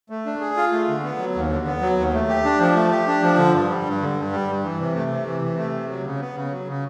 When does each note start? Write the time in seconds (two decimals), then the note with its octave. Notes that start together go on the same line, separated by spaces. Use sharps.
0.10 A3
0.26 D4
0.40 G#4
0.57 F4
0.72 A3
0.88 D3
1.03 B3
1.19 F#3
1.35 D#2
1.50 D3
1.66 B3
1.81 F#3
1.98 D#2
2.13 A3
2.28 G4
2.44 D4
2.60 F3
2.76 A3
2.91 G4
3.07 D4
3.23 F3
3.38 D3
3.54 G2
3.69 G3
3.86 G2
4.02 D3
4.17 G2
4.32 G3
4.48 G2
4.64 E3
4.79 C3
4.96 A3
5.10 C3
5.27 E3
5.41 C3
5.58 A3
5.73 C3
5.89 F#3
6.04 C#3
6.20 B3
6.36 C#3
6.52 F#3
6.68 C#3